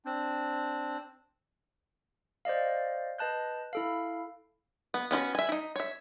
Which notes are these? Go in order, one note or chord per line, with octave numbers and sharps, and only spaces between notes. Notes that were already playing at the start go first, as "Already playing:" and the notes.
C4 D4
C5 D5 D#5 F5
B4 D#5 A5 F#6 G6
E4 A4 F5
B3
B3 C#4 E4 F#4
E5 G#5
D#4 E4
C#5 E5